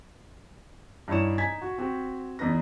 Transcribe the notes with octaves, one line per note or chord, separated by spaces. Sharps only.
G2 D#4 E4 C#5 E7
D#4 G#5 G#6 B6
F#4
C4 F#4 G4
E2 D#4 B4 A#6